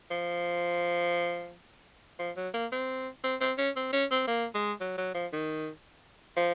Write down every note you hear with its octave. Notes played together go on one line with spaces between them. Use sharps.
F3
F3
F#3
A#3
C4
C4
C4
C#4
C4
C#4
C4
A#3
G#3
F#3
F#3
F3
D#3
F3